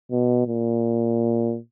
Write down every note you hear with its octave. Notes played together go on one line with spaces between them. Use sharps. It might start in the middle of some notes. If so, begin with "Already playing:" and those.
B2
A#2